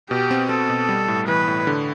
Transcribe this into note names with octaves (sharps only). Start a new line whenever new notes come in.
B2 G4
C4
C4 A4
B2
G3
A2
E3 B4
A2
D3